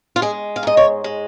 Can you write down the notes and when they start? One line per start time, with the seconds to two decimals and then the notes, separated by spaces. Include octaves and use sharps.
0.16 F4
0.22 G#3 G#4
0.56 F5
0.63 G#2 D#5
0.77 C#5
1.04 G#3